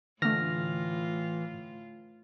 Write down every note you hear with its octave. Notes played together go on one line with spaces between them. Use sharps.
A2 D3 E3 A3 F4 F6 A#6